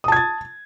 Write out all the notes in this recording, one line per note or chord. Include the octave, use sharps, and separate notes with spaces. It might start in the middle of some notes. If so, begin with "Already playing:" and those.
A5 D#6 G#6 A6